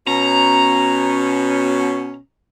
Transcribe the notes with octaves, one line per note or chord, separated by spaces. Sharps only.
B2 C#4 A#5